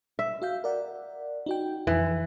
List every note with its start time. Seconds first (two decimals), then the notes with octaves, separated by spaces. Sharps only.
0.19 E5
0.42 F#4 F5 G6
0.64 A#4 D5 F#5
1.46 D#4 F#4 G5
1.87 F2 E3